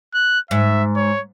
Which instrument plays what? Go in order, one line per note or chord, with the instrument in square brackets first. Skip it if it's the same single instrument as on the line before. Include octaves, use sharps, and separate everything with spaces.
[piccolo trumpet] F#6
[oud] G#2 [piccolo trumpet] E5
[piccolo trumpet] C#5